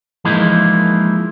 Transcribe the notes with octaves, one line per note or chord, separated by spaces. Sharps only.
E3 F3 G#3 A#3 D#4 E4